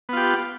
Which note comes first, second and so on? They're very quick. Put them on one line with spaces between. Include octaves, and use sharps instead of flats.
B3 F4 G4